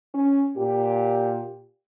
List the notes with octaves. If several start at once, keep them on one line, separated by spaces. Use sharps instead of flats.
C#4
A#2 G4